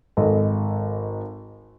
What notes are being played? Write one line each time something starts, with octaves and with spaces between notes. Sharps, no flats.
G#1 A4 D#5